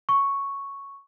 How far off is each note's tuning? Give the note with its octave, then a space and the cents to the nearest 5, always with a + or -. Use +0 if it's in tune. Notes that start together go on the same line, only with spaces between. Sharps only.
C#6 +0